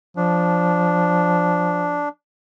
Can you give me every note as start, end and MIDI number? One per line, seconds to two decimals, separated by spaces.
0.17 2.06 53
0.17 2.09 62